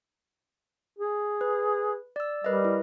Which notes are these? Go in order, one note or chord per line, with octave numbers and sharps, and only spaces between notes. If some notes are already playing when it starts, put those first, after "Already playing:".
G#4
B4
D5 E6
G3 A#4 B4 D#5
E4